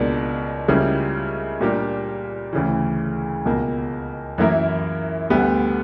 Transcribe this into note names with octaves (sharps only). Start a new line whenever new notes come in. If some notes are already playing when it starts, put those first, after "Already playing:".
Already playing: C#2 B2 A#3 D4
C#2 C#3 G3 A#3 E4
A#2 G3 A#3 D4 G4
D2 C#3 E3
C#2 B2 A#3
F#2 E3 A#3 E4 A#4
D2 D3 G3 B3